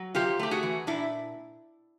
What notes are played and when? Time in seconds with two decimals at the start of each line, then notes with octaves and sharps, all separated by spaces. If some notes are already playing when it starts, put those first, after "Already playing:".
Already playing: F#3
0.15 C3 F4 G4
0.39 A3 G4
0.51 F#4 G#4
0.63 E3
0.87 A#2 D4 E4